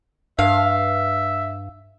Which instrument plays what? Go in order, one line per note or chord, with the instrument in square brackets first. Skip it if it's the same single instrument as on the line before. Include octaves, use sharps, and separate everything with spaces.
[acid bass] G2 [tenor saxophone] E5 [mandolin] F5